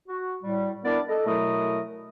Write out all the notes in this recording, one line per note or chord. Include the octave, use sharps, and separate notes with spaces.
F#4
A2 G3
B3 D4 E4 A#4 D5
A4 D#5
B2 F#3 A3 E4 A#4 D#6